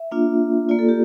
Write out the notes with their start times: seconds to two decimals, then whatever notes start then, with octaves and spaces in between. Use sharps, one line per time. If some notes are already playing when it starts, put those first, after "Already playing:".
Already playing: E5
0.11 A#3 D4 F4
0.69 A#3 F4 D5
0.79 A4
0.89 G4